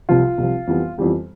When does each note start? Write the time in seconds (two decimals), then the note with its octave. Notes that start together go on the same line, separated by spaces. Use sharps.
0.09 C2 C3 F3 F4
0.38 C2 C3 F3
0.67 F2 E3 G3 B3
0.98 F2 E3 G3 B3